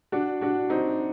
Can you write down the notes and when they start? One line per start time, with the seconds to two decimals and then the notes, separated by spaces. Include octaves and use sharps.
0.12 D4 F#4
0.41 D4 F#4
0.70 C4 D#4